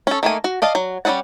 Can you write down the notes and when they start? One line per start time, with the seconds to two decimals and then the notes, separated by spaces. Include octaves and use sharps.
0.07 C#4 A4
0.23 D#3 A3 A#3 G#5
0.44 F#4
0.62 D5 D#5 F5 A5
0.75 F#3
1.05 G3 C#4 G#4 D5 F#5